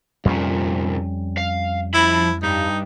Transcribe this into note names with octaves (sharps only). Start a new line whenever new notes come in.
C2 F2 A#2 G3 C#4
F5
F3 E4 B5
G2 D#4